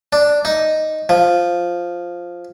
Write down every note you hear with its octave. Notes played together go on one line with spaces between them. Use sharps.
D4
D#4
F3